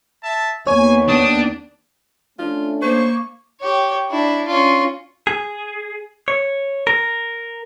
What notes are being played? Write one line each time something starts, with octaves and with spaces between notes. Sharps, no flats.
E5 A5
D#2 B3 C#5 G#5
D4 G4 D#6
A3 C#4 D4 F4
A#3 C5 C#6
G4 C#5
D4 E4
C#4 F4
G#4
C#5
A#4